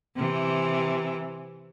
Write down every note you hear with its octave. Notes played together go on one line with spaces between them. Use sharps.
C3 E3